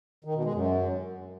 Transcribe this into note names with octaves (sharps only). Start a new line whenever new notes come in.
D#3
B2
G#3
F#2